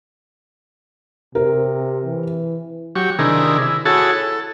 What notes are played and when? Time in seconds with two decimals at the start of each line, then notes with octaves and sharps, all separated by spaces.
1.35 C3 A#4
2.05 E3
2.96 F#3 G4 C#6
3.19 C3 D#3 D4 E4 G#4 A#4
3.62 E4
3.85 E4 F#4 G#4 A4 C#5 A5
4.12 A4